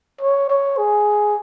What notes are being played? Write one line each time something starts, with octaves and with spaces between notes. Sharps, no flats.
C#5
C#5
G#4